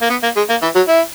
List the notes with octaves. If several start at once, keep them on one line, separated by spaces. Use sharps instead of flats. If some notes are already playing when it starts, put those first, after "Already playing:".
A#3
B3
A#3
G#3
A#3
E3
F#3
E4